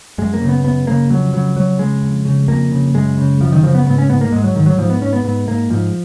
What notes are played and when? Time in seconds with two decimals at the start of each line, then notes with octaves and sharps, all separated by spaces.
0.18 F#2 G#3
0.34 A#3
0.41 C#3
0.49 B3
0.64 F#2 B3
0.87 C#3 A#3
1.10 F2 F#3
1.33 C#3 F#3
1.56 F2 F#3
1.79 C#3 G#3
2.03 F2
2.25 C#3
2.48 F2 A#3
2.71 C#3
2.94 F#2 G#3
3.18 C#3
3.40 F#2 F3
3.52 D#3
3.63 C#3 F3
3.75 B3
3.86 G#2 B3
3.98 C#4
4.09 G#2 B3
4.21 A#3
4.32 G#2 G#3
4.44 F#3
4.55 G#2 D#3
4.66 F#3
4.78 G#2 F3
4.90 B3
5.01 G#2 C#4
5.13 B3
5.24 G#2 B3
5.47 G#2 A#3
5.70 G#2 F3